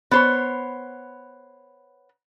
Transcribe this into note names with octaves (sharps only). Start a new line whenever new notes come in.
B3 C5 C#5